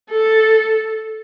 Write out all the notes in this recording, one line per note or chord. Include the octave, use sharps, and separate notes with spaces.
A4